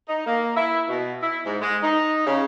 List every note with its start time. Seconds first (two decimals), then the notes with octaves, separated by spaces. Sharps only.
0.09 D#4
0.27 A#3
0.56 E4
0.89 B2
1.22 E4
1.46 G#2
1.62 G#3
1.83 D#4
2.26 C#3